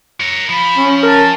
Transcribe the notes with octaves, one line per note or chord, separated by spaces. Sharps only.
A#4 C#5
F3 B5
C#4
A#4 A5